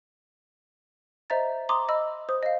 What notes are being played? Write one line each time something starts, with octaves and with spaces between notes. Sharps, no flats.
C5 D#5 E5 A#5 A6
A#5 C6 D6 D#6
D#5 B5 E6
C5 D#6
D#5 F5